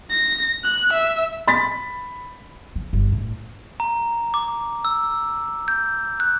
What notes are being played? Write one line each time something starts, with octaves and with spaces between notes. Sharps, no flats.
A#6
F#6
E5
B5 A6 B6
F3
G1
A2
A#5
D6
E6
G6
F#6